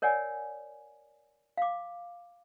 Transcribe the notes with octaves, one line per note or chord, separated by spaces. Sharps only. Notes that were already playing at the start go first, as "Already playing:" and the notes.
A#4 C#5 D5 F#5 G#5
F5 D6